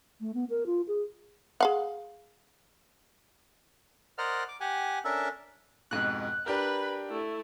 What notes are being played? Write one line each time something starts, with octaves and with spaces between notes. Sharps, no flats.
A3
B3
A#4
F4
G#4
G#4 F5 F#5
A#4 C5 D5 D#5 F#5 F6
D6
G4 F#5 G#5
C#4 D4 A4 A#4 E5
F2 G#2 B2 F#6
D4 G4 A#4 B4 B5
A3 E4